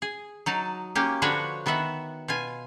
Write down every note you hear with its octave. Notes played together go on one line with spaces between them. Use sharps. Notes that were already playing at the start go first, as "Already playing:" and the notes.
G#4
F#3 D#4 A5
A#3 C#4 G4
D3 F3 D4 F#4 B4 C#5
D#3 B3 F#4 E5 F#5
B2 F4 G#5